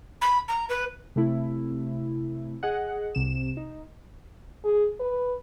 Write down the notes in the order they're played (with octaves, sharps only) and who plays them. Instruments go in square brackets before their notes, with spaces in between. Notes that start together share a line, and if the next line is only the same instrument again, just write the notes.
[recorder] B5
A#5
B4
[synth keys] C3 A3 E4
G#4 D#5 F#5
C2 C3 E7
D#4
[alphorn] G#4
B4